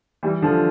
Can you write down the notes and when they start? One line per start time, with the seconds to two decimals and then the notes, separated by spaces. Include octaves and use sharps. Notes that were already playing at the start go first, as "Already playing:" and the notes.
0.23 E3 G3
0.42 D3 F3